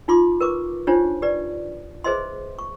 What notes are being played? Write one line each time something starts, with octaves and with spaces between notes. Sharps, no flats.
D#4 F4 C6 D6
A#4 B4 C#6 D6
D4 D#4 F4 G4 C5 C#5
G4 B4 D5
G#4 B4 C5 D#5 E5 C6
C#6